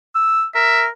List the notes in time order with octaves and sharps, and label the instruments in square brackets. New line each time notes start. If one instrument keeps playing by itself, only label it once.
[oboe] E6
[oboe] A#4 [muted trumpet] E5